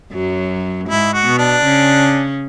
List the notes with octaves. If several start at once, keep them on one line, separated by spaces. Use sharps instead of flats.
F#2 F#3
G#2 G#3 E4
F#4
B2 B3
D4
C#3 C#4